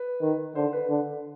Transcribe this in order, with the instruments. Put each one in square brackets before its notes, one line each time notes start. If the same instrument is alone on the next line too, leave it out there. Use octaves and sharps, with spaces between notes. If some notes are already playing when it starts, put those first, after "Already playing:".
Already playing: [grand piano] B4
[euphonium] D#3
[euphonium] D3 [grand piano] C5
[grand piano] B4
[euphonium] D3